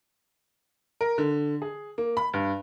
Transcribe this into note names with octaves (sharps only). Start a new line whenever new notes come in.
A#4
D3
G#4
A#3
B5
G2